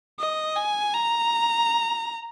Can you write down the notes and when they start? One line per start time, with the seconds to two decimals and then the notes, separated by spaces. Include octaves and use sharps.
0.19 D#5
0.56 G#5
0.94 A#5